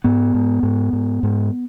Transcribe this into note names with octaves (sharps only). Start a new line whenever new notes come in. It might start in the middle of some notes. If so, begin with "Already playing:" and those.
G#2 B3
G#2
G#2
G#2
G#2